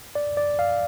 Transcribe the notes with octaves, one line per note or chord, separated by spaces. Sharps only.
D5
D5
F5